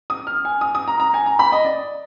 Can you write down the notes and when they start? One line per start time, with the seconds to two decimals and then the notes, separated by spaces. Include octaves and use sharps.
0.10 D#6
0.27 F6
0.45 G#5
0.61 D#6
0.75 D#6
0.88 A#5
1.00 A#5
1.14 G#5
1.26 A#5
1.39 B5
1.52 D#5
1.65 D5